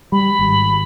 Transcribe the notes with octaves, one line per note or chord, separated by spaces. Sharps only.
G3 B5
G#1